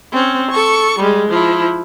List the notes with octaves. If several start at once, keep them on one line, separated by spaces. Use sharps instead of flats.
C4 C#4
A4 C#6
G3 G#3
F3 E4